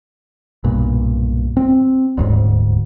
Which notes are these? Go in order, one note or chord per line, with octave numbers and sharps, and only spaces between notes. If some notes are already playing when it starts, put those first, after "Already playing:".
B1 G2 A#2
C4
D#1 D2 G#2